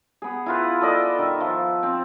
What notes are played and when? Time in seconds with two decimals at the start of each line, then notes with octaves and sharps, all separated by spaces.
0.22 B3 G#4
0.46 E4 F4 B4
0.81 A4 D5 D#5 B5
1.19 D#3 E5
1.40 F3
1.83 C4